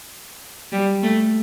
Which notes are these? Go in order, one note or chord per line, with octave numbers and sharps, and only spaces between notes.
G3
A3